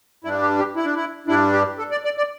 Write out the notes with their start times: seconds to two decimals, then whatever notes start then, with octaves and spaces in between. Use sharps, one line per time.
0.24 G2 G3 D4 E4
0.41 G4
0.59 G4
0.76 E4
0.85 D4
0.95 E4
1.27 G2 G3 D4 E4
1.53 G4
1.78 A4
1.91 D5
2.04 D5
2.17 D5